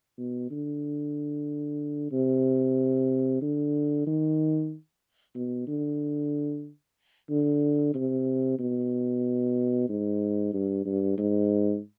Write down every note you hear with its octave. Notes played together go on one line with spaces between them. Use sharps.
B2
D3
C3
D3
D#3
B2
D3
D3
C3
B2
G#2
G2
G2
G#2